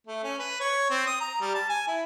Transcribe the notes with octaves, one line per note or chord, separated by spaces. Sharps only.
A3
C#4
B4
C#5
C4
D#6
A#5
G3
A5
G#5
E4